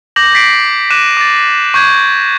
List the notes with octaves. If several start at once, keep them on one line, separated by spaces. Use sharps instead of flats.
D6 G6 A#6 F#7
A6 B6 C7 D7
D6 F#6 B6 D#7 E7
D6 A6
C#6 G6 G#6